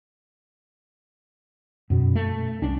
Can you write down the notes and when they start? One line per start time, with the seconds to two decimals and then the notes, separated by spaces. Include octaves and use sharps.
1.90 F#2 B2
2.15 A3
2.62 C2 C#4 D4